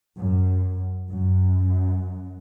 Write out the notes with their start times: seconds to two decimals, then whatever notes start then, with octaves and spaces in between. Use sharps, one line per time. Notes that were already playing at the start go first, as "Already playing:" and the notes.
0.17 F#2
1.12 F#2